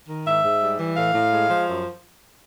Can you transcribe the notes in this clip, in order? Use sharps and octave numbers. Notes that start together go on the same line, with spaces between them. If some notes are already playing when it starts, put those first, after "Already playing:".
D#3
G#2 E5
G#2
G3
E3
A2 F5
A2
G#3
F3
F#2